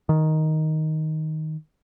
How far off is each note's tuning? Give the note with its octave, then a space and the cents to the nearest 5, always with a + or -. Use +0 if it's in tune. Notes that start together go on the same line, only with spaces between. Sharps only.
D#3 +5